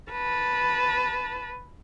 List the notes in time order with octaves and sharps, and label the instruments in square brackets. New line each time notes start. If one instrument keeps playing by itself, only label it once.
[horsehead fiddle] B4 A5